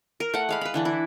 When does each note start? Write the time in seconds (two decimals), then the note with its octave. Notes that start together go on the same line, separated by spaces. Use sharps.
0.20 A#4
0.34 A3 F#5
0.49 G#3 F5 B5
0.61 B4 B5
0.74 D3 E3 D4
0.85 E4